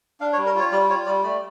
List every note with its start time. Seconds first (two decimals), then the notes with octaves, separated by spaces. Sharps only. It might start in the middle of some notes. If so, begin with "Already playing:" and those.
0.20 D4 F5
0.33 C#5
0.37 G3
0.46 A#4
0.55 F4 C#5
0.72 G3 D5
0.89 F4 C#5
1.06 G3 D5
1.24 A3 D5